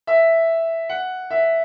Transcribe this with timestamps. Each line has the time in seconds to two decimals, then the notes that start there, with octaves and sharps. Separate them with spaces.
0.07 E5
0.89 F#5
1.30 E5